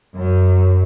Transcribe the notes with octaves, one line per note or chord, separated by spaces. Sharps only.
F#2